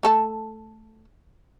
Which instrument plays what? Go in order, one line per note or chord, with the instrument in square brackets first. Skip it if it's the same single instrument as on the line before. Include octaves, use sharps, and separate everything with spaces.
[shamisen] A3 A4 A5